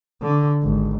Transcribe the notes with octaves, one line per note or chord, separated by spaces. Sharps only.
D3
G#1